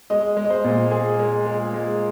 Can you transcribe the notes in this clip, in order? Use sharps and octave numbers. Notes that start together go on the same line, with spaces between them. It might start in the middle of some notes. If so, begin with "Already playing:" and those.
G#3 D#5
G#3
D#5
C5
A#2
G#3 G#4
G#3
G#3
G#3